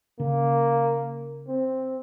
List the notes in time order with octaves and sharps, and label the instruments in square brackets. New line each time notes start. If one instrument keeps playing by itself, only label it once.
[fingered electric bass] C#3 [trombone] A#3
[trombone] C4